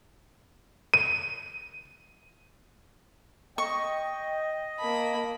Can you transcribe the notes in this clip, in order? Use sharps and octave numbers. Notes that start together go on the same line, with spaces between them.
D#7
D#5 G5 C#6
A#3 A5 B5